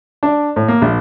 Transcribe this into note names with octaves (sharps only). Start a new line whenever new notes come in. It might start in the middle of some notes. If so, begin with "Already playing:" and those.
D4
A2
A#3
A#1